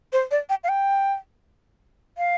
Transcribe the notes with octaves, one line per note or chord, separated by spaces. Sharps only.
C5
D5
G5
F5
G5
F5